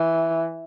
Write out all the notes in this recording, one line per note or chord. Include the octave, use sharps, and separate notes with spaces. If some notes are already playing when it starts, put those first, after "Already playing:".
Already playing: E3